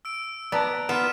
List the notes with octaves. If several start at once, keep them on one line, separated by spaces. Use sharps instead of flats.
E6 D7
B3 D5 A5 A#5
B3 F4 F6 B6 E7